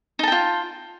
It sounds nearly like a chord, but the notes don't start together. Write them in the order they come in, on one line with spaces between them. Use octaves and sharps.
D#4 A5 G5 F4